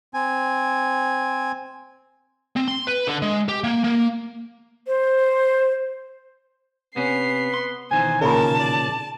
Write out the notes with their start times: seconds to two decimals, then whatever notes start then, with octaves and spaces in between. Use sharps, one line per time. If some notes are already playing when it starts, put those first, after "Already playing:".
0.14 C4 G#5
2.56 C4
2.68 C6
2.87 B4
3.07 D3
3.22 G#3
3.48 G4
3.64 A#3
3.84 A#3
4.87 C5
6.96 C3 B3 C#4 C7
7.54 C6
7.91 B2 D#3 E3 C5 G#5
8.21 A#2 C#3 A#4 A5
8.60 D5